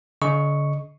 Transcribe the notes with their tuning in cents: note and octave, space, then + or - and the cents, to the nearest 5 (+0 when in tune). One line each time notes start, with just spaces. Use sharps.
D3 -40 D#5 +0 C#6 +0